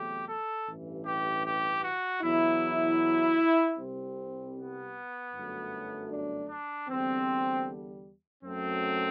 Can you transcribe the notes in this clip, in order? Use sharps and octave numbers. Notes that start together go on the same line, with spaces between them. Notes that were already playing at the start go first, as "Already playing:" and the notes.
Already playing: E2 C3 F#3 A3 G4
A4
A1 G2 E3
G4
G4
F#4
E2 B2 F#3 E4
C2 C3 G3 C4
B3
G1 F#2 F#3 A3
D4
D4
E2 D3 G3 C4
F#2 F#3 A3 C4